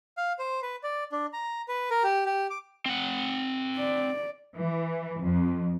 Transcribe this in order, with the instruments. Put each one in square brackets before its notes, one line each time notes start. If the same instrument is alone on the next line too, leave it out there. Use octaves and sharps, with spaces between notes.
[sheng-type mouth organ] F5
C5
B4
D5
D4
A#5
B4
A#4
G4
G4
D6
[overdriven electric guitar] C4 F#5
[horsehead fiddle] D5
[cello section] E3
F2